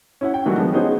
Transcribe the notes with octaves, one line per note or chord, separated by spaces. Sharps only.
C#4 E4 F#5
G5
D#3 E3 F#3 G3 F#4
D3 F3 G#3 B3
B3 C#4 D#4 F#4 G#4 C5